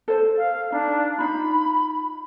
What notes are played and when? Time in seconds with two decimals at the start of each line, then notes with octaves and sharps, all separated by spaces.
0.08 A4 C5
0.38 F5
0.72 D4 D#4
1.18 D#4 F4 B5